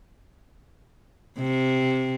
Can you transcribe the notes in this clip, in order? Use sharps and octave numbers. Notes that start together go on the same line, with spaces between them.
C3